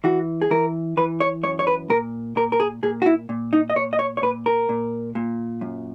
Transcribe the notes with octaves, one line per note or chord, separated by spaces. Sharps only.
E3 F#4
G#4
E3 A#4
E3 B4
C#5
F#2 C#5
C#5
B4
A#2 A#4
A#2 A#4
A#4
G#4
A#2 G#4
F#4
E4
A#2
D#4
D#5
A#2 C#5
D#5
C#5
C#5
A#2 B4
A#4
A#2
A#2
F#2